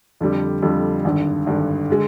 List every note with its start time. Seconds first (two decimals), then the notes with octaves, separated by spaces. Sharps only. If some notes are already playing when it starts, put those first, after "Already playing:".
0.21 F2 D3 G3
0.62 F2 D3 G3
1.04 G#1 G2 D3
1.46 G#1 G2 D3
1.90 D3 G#3